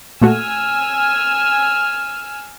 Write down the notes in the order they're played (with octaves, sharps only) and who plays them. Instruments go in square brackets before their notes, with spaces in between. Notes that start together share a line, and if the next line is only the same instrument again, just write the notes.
[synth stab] A#2 A3 F#4 [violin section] G#5 E6 F6